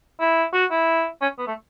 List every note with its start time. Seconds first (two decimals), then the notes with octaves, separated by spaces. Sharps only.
0.20 E4
0.53 F#4
0.71 E4
1.22 C#4
1.39 B3
1.47 A3